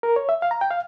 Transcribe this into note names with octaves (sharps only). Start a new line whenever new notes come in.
A#4
C#5
E5
F5
A#5
G5
F5